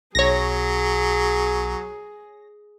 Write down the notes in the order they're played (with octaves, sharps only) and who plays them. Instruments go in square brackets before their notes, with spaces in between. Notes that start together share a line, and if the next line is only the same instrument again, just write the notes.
[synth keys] B1 [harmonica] F#3 [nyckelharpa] G#4 [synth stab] C#5 A#6